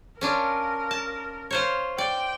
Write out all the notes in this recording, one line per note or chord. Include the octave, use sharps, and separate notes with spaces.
C#4 D4 F4 A#4
A5
F4 C5 C#5
D5 G5